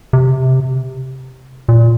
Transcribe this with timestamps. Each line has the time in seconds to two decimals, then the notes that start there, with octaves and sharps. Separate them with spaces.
0.13 C3
1.69 A#2